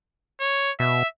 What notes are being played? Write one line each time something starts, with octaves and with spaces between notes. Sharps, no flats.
C#5
B2 E5